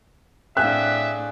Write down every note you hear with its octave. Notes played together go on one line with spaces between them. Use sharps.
A2 C4 D4 G#4 E5 F5 F#6